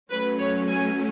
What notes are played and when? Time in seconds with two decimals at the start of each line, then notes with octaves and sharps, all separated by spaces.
0.10 F#3 A3 C#4 B4
0.39 C#5
0.68 G#5